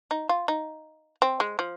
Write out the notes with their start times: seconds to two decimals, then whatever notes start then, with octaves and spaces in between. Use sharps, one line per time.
0.11 D#4
0.29 F4
0.48 D#4
1.22 C4
1.40 G#3
1.59 F3